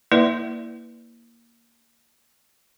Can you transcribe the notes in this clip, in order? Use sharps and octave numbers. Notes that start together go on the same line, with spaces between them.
A#3 E4 B4 D5 E5